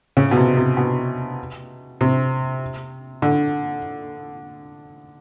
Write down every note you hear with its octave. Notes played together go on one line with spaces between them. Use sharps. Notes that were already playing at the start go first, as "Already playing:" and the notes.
C#3
B2
C3
C3
B2
C3
D3